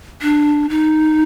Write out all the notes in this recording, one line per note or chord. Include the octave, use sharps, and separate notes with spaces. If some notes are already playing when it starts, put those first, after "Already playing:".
D4
D#4